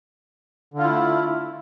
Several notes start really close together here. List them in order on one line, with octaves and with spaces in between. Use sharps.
D3 F4 E4 A3